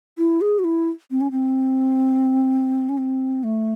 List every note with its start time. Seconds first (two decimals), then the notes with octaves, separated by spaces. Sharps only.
0.18 E4
0.41 G#4
0.59 F#4
0.64 E4
1.11 C4
1.21 C#4
1.31 C4
2.89 C#4
2.98 C4
3.44 A3